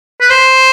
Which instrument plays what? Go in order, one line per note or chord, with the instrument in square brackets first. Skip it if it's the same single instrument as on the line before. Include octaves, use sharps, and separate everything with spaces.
[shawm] B4
C5